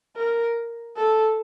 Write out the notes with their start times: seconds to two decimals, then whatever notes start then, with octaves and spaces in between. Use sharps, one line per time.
0.16 A#4
0.96 A4